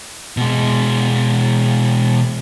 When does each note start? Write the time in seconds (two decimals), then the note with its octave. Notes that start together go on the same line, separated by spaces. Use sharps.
0.37 B2 G#3